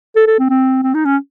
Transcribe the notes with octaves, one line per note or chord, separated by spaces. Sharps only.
A4
A4
C4
C4
C4
D#4
C#4